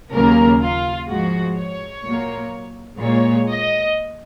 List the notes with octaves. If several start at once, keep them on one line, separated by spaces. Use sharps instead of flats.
D#2 C#3 F#3 A#3 A#4
F4
G#2 F3 G#3 F#4
C#5
A#2 F#3 A#3
A#2 G#3 C#5
D#5